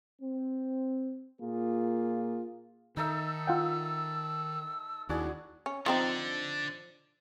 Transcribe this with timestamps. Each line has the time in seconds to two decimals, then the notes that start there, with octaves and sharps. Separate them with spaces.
0.22 C4
1.41 A#2 A#3 F4 G#4
2.97 D#3 D#4 A4 E5 E6
3.47 F4 F#5 G5
5.09 D#2 D4 E4 F#4 G#4
5.66 C#4
5.86 D3 F3 C4 D#4